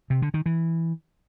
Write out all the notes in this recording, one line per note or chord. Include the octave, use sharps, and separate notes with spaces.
C3
D3
D#3
E3